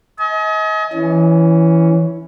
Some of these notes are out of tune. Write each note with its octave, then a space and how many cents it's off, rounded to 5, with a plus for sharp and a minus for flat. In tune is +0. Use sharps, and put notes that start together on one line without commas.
D#5 +35 G#5 +40
E3 +0 C#4 +5